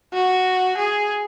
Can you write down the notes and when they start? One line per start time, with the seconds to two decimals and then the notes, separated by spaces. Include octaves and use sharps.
0.14 F#4
0.77 G#4